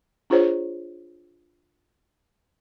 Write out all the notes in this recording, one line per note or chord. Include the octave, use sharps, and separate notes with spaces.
D4 F4 G#4 C5 C#5